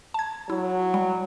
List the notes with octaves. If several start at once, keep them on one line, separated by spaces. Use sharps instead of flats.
A5 G#6
F#3 E4
G3